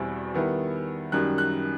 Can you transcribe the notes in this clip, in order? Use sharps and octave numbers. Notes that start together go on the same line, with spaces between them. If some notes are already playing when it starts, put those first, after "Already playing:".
Already playing: E2 B2 G3 C4 E4
D#3 G3 B3 E4
F#2 D#3 G3 D#4 F#6
F#6